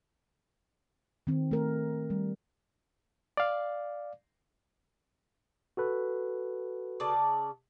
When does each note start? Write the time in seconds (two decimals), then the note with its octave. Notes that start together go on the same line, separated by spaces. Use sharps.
1.27 D#3 C4
1.51 A3 A#4
2.10 G3
3.37 D5 F5
5.77 F#4 A4 B4
7.00 C#3 D5 A5